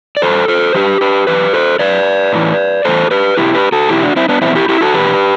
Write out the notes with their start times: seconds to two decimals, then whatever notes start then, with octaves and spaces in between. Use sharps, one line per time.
0.17 D5
0.22 E3 A4 C5
0.27 G2
0.48 A4 C5
0.74 G2 E3 G4 B4
1.01 G4 B4
1.27 F#2 E3 G4 B4
1.53 A4 C5
1.79 F#2 E3 B4 D5
2.33 A2 E3
2.85 A2 E3 A4 C5
3.11 G4 B4
3.37 E2 B2 E4 G4
3.54 G4 B4
3.72 F#4 A4
3.89 E2 B2 E4 G4
4.03 D4 F#4
4.16 C4 E4
4.29 B3 D4
4.41 E2 B2 C4 E4
4.55 E4 G4
4.69 E4 G4
4.81 F#4 A4
4.94 E2 B2 G4 B4